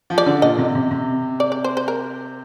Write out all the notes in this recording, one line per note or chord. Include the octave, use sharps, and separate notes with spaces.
F3
D5
D3
A#2 D#5
C3
C3
C3
D5
D5
C5
C5
A#4